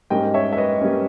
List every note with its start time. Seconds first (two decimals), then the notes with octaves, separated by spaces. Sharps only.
0.10 G#2 G3 A#3 C#4 D#5 G5
0.34 C#5 E5
0.53 E5
0.57 B4 D#5
0.81 G3 A#3 C#4